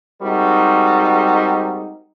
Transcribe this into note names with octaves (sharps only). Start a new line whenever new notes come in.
G3 G#3 C4 D#4 F#4 A#4